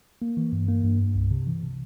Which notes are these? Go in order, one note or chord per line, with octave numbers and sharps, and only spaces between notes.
A#3
E3
G2
A#3
G2
G2
C2
C3
E3
C3